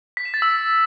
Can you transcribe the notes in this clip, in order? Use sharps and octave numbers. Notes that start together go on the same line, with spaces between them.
B6
E7
A6
E6